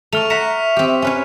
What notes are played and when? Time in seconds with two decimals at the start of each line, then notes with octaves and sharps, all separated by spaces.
0.13 A3 C#6 F6 F7
0.30 E5 F#5 A#5 B6 C#7 E7
0.76 C4 G4
1.02 C#4 B4 C#5